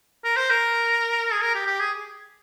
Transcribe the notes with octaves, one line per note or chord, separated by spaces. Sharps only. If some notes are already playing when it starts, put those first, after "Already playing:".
A#4
C5
A#4
G#4
A#4
G4
G4
G#4